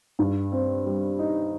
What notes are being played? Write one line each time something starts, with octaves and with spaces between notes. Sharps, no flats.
G2
C4
G3
D#4